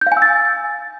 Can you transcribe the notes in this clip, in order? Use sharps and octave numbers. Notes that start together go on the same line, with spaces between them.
G6
F5
G#5
E6
A6